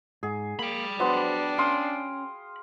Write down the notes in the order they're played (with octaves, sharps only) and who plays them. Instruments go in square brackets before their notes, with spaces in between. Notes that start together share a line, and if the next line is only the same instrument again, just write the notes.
[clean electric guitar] G#2 [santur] G#4
[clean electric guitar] A#3 [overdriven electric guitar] G5 B5
[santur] F#3 B3 [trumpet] D4 [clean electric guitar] C5
[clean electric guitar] C#4 [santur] F5 C6 D#6